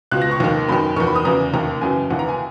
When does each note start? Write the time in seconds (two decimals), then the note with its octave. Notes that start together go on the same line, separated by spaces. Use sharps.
0.11 C#2 B2 F#6
0.22 A#6
0.31 C#6
0.40 D#2 D#3
0.69 F#2 D#3 B5
0.96 E2 D#3 C#6
1.07 B5
1.15 D#6
1.25 E2 C#3 E3 A#5
1.53 D#2 D#3 A#5
1.81 F#2 C#3 E3 G#5
2.10 D#2 C#3 E3 F#5
2.19 A#5
2.29 G#5